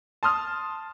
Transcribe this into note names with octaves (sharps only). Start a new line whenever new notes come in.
A5 C6 D#6 F6